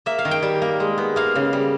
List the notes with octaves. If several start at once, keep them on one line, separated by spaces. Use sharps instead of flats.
A#3 E5
F5
D#3
G5
G3
A#3
G#3
B3
A#3 F5
C#3
G3